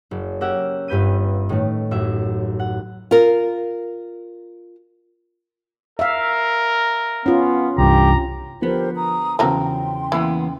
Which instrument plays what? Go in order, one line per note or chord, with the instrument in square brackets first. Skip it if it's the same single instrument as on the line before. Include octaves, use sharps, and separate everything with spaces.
[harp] F#1
A#3 C#4 G4 E5 F#5
G1 G2 B4 G6 D#7
A2 D#3 A3
A1 F#2 E4 E5
F#5
[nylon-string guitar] F4 A#4
[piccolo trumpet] A#4 [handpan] E5 F5
[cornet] B3 [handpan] C#4 F4
[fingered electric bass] C2 G2 [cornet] G4 [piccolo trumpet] A#5
[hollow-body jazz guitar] D3 B3 [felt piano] F3 [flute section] G4 A#4 C5
[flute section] A#5 D#6
[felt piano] E2 C#3 [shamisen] F3 F#3 A#5 [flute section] G5 C6
[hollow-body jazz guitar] E3 A#3 B3 [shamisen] E4